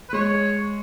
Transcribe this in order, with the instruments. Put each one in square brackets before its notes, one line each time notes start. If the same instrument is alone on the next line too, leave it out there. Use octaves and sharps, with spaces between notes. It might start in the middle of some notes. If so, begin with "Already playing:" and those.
[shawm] B4
[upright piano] G#3 [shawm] C#5